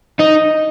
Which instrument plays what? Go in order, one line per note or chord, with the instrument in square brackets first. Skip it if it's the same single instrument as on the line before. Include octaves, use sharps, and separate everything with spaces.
[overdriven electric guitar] D#4 [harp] D#5